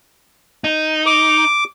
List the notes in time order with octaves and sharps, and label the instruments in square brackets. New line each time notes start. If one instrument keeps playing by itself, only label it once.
[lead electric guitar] D#4
[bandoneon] D6